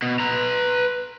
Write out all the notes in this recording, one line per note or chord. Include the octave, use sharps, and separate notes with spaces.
B2
B4 A#5